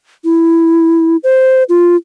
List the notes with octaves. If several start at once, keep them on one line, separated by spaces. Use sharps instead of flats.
E4
C5
F4